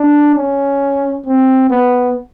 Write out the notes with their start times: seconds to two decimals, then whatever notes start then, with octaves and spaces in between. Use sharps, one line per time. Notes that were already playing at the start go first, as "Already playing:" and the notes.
Already playing: D4
0.35 C#4
1.26 C4
1.70 B3